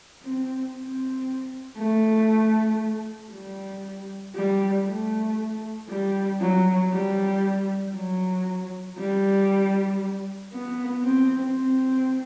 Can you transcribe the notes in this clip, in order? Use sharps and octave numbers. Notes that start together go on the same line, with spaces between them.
C4
C4
A3
G3
G3
A3
G3
F#3
G3
F#3
G3
B3
C4
C4